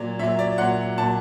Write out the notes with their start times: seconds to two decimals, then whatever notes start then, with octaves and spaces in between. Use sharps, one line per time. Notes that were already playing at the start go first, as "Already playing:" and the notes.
Already playing: A#2 F#3 D5
0.19 A#2 F#3 E5
0.39 D5
0.58 A#2 F#3 F#5
0.98 A#2 F#3 A5